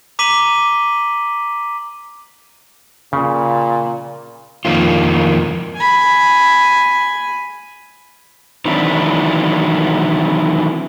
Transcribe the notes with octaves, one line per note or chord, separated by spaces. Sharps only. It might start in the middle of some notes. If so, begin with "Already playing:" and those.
A#5 D6 B6 D#7 F#7 G7
A#2 C#3
F2 D#3 A#3 F4
G#5 B5
D#3 E3 F#3 C4 D4 E4